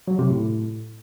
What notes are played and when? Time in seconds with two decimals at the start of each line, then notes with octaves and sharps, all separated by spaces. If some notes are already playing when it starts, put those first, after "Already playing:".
0.08 F#3
0.19 C3
0.30 A2